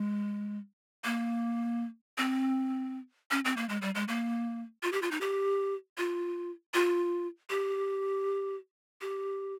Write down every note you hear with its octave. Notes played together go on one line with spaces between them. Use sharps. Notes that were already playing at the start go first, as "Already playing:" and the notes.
Already playing: G#3
A#3
C4
C#4
C4
A#3
G#3
G3
G#3
A#3
F4
G4
F4
D#4
G4
F4
F4
G4
G4